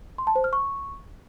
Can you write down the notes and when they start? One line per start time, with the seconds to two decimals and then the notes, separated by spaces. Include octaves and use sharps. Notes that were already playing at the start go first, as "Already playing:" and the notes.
0.18 C6
0.27 A5
0.36 C5
0.44 F6
0.53 C#6